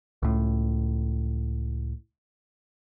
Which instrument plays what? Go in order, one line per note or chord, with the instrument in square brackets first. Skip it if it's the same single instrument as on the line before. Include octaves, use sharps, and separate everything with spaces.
[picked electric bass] C#2 A2